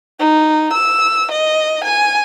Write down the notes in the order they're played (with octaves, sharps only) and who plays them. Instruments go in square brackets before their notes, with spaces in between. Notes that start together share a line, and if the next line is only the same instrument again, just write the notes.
[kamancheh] D#4
E6
D#5
G#5